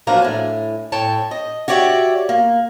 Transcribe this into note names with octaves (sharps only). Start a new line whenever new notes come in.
F3 F#3 A#3 D4 A#4 B4
A2 G#5
A2 C#5 G5 A5
D#5
F#4 G4 C#5 D5 E5
A#3